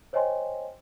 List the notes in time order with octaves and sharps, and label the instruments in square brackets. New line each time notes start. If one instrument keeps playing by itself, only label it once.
[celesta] C5 C#5 D#5 G5 G#5 C6